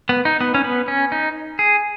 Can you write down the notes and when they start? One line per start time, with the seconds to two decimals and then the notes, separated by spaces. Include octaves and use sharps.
0.09 B3
0.25 D#4
0.41 B3
0.54 C#4
0.64 B3
0.88 C#4
1.12 D#4
1.59 G#4